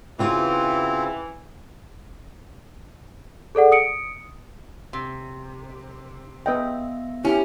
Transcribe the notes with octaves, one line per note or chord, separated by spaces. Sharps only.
C#3 E3 C4 F4 F#4
G#4 A4 D5 F#5
D#6 C#7 D7
C3
B3 B4 D#5 E5 G5
C#4 E4 G4